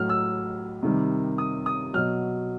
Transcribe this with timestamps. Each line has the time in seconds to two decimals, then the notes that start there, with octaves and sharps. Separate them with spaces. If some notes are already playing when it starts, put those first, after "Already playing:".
Already playing: A2 F#3 F6
0.09 E6
0.83 C3 D#3 G3
1.38 D#6
1.66 D#6
1.94 B2 F#3 F6